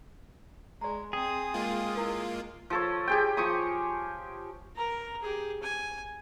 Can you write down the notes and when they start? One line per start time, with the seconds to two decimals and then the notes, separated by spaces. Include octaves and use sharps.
0.81 G#3 D5 A#5
1.13 C4 G#4 G5 D#6
1.54 G#3 A#3 F4
1.95 E4 A#4 F5
2.70 F3 A4 C#5
3.07 G4 G#4 G5
3.37 F3 C#6 D#6
4.76 A#4 A#5
5.22 G4 G#4
5.63 G#5